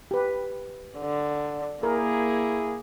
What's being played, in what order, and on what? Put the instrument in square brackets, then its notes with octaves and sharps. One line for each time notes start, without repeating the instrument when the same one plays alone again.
[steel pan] G4 B4
[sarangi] D3
[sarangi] A#3 [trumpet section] E4 G#4 [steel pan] A#4